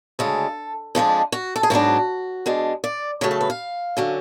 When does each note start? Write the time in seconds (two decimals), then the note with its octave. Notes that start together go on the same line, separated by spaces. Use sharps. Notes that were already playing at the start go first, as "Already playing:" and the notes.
0.19 D2 C#3 G#3 A4
0.95 F2 F3 G#3 D4
1.32 F#4
1.56 A4
1.63 G#4
1.70 G#2 F#3 B3 D4 F#4
2.46 B2 G#3 D4
2.84 D5
3.21 C#3 F#3 A3 C#5
3.31 A4
3.41 B4
3.50 F5
3.97 D3 F#3 C#4